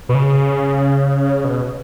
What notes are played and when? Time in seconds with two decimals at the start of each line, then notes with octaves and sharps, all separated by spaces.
0.09 B2
0.15 C#3
1.44 B2